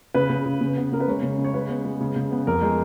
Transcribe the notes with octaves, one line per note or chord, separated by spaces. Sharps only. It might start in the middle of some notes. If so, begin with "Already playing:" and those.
C#3 B4
C#3
C#3
C#3
B3
C#3 A#4
B4
G#3 C#5
C#3
C#3
C#5
G#3 B4
B3
G#3
C#3
C#3
B3
F2 A#4
G#3